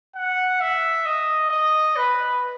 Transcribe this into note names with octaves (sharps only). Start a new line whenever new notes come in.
F#5
E5
D#5
D#5
B4